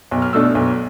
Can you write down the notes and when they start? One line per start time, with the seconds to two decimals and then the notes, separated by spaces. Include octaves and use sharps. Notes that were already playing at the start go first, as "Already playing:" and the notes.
0.11 B1
0.22 F6
0.33 B2 A3 D4 E6
0.55 B1